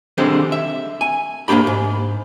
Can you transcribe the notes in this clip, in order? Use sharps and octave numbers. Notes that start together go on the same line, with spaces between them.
D3 D#3 G3 G#3 C4 C5
E5
G#5
D2 G#2 A#3 D4 G4 B5
G#2